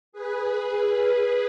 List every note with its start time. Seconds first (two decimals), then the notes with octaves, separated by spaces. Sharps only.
0.12 G#4 B4